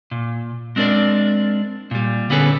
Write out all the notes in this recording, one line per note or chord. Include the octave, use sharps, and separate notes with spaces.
A#2
G#3 C4 D4 A#4 D5
A#2 G3
D3 B3 C#4 G#4 A4 B4